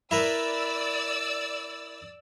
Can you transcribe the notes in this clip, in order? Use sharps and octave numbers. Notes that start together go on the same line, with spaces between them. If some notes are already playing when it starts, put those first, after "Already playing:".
E4 A#4 B4 D5 E6